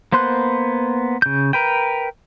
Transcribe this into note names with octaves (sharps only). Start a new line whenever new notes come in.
A#3 B3 C5 C6 F#6
C#3 G6
A#4 B4 G5